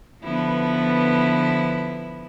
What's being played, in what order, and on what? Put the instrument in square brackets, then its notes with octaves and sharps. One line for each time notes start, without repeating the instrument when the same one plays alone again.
[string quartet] D3 F3 B3 E4 B4